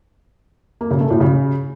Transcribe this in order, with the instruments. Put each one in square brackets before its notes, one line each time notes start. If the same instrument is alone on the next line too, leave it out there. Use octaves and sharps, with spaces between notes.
[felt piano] A#3
C#3
A3
A2
C#3